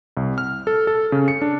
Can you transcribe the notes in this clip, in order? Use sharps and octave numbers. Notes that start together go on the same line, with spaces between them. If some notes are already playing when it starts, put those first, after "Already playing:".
C2
F6
A4
A4
C#3
C#7
D4